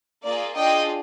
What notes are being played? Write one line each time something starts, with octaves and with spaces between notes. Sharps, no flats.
A#3 F4 G#4 D5
D4 F4 G#4 D#5 G5